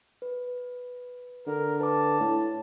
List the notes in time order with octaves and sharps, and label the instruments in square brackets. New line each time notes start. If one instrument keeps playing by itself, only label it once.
[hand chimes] B4
[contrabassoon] D3 [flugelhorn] A#4
[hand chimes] B4 D6 [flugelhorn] A5
[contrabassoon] A2 [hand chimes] C#5